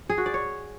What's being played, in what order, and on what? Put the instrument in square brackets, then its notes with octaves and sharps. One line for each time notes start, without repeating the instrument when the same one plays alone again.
[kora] G#4
F#4
D5
C#5